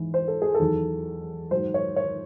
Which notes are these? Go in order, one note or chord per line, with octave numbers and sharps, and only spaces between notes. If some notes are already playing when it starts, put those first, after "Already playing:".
Already playing: G#2 E3
C5
A4
G#4
A4
E2 D#3 F#3
G#2 F#3 C5
C#5
C#5